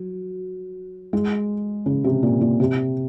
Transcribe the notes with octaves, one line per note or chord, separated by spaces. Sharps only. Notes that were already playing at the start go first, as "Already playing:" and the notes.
Already playing: F#3
G#3
C#3
C3
A#2
A#2
C3